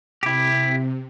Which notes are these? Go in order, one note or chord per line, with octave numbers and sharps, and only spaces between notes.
C3 E4 G4